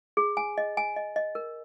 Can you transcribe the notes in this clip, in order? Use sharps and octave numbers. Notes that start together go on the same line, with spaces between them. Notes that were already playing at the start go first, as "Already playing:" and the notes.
G#4
G#5
D#5
G#5
D#5
D#5
A#4